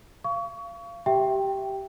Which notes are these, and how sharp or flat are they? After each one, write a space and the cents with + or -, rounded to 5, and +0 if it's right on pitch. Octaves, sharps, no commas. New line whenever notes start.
F5 -25 C#6 +30
G4 -15 E5 +0 G5 +0